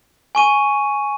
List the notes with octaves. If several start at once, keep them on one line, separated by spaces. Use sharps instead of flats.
G#5 C#6 D#7